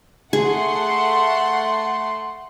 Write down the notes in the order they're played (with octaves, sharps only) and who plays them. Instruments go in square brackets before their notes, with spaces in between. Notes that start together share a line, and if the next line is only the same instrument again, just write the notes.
[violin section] A3 F#5 C6 [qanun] G#4